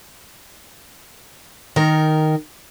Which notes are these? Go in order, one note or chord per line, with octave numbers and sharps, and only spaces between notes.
D#3 A#4